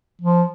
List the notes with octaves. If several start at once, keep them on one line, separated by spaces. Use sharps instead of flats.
F3